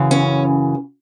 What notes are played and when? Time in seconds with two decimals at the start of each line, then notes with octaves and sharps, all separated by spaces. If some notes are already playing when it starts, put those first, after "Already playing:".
Already playing: F#2 C#3 E3
0.11 C#4